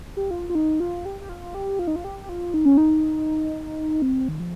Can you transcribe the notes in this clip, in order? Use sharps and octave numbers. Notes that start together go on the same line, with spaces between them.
G4
F4
F4
D#4
F4
G4
G4
F4
G4
F4
D#4
F4
G4
F4
D#4
C#4
D#4
C4
D#3
F3